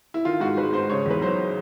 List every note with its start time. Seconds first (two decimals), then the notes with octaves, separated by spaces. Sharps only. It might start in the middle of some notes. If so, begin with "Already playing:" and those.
0.14 E4
0.25 D#3 F4
0.40 G#2 F#4
0.57 G#3 B4
0.73 G#2 C5
0.90 C#3 C#5
1.06 E2 B4
1.22 F#3 C5